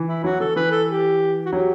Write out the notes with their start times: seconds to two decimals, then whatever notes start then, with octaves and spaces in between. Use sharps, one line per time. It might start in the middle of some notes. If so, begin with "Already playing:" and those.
Already playing: E3
0.08 E4
0.24 F#3 F#4
0.40 E3 A4
0.56 E3 B4
0.72 A4
0.88 G4
1.46 F#4
1.52 F#3 G4